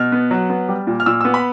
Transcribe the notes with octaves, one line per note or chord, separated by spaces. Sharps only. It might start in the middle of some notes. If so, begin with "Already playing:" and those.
Already playing: B2 F6
B3
F#3
B3
G3
A#2
F6
A#2 E6
B3 E6
B5